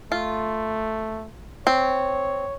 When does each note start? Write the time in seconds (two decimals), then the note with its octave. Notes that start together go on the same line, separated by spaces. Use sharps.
0.12 A3 F4
1.67 C4 C#5